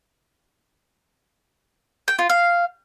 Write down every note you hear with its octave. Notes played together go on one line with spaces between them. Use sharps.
G5
F4
F5